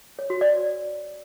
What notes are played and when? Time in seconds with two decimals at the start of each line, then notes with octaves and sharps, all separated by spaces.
0.19 C#5
0.30 F#4
0.41 D5